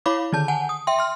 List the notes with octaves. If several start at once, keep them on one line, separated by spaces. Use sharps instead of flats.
E4 C#5 F5 B5 D6
D3 D#3 A5 G6
F#5 G#5 A5
D#6
E5 G5 C6
C6 F6